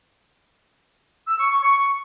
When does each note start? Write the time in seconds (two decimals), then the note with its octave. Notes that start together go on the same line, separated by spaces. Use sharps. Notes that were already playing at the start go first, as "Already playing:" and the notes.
1.28 E6
1.40 C#6
1.52 C#6
1.63 C#6